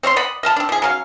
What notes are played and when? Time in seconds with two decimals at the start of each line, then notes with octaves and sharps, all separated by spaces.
0.03 C4 C#5 E5 C6
0.16 D5 D#5 F#5 B5
0.43 D#5 F5 A5 B5
0.56 C4 D4
0.69 F3 G#4
0.82 F#3 C#4 F5